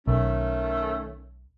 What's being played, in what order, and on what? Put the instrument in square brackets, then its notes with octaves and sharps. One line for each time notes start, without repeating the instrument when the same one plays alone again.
[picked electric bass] B1 [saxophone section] D#3 A3 C#4